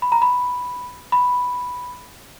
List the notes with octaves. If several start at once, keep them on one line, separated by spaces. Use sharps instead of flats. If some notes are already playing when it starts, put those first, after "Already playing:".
B5
A#5
B5
B5